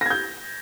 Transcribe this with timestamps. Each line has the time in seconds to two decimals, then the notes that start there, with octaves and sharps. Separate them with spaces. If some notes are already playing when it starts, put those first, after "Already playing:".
0.01 A#6
0.06 G#6
0.10 G6